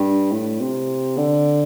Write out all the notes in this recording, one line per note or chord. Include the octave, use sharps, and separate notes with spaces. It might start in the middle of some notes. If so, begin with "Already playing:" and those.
Already playing: G2
A2
C3
D3